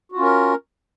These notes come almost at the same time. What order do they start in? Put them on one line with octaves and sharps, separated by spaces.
F#4 F4 C#4 A#4